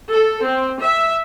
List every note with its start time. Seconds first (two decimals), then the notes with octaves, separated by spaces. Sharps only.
0.12 A4
0.44 C4
0.81 E5